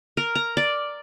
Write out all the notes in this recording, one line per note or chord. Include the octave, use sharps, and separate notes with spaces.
A#4
A#5
D5